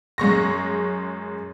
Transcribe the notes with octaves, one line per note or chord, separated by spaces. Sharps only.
F#2 G#3 C#6 A#6